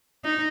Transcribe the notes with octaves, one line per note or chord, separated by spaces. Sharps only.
D#4